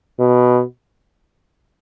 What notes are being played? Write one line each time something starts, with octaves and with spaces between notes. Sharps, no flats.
B2